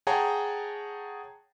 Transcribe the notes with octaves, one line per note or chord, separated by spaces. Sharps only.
G#4 C#5 F#5 G5 A5 A#5